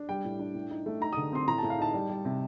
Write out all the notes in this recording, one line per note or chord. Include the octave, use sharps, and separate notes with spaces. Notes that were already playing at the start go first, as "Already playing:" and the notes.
Already playing: D4
G3 G5
A2
D4
A2
D#4
A3
D#4 A#5
D3 D#6
C4 C6
A2 A#5
A2 A5
F5
D#4 A5
G3
G3
C3